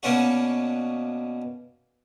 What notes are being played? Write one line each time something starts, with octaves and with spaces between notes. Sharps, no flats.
B2 A#3 B3 C#4 D4 F#4